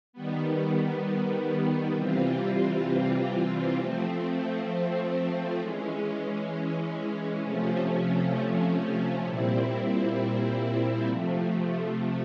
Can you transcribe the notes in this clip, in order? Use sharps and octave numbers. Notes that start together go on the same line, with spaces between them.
D#3 G3 B3
C3 E3 G3 C4 F4
F3 A3 C4
E3 G#3 C#4
C3 F3 A3 C#4
A#2 G3 C4 E4
C3 F3 A3